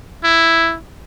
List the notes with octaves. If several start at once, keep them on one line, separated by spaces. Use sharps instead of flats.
E4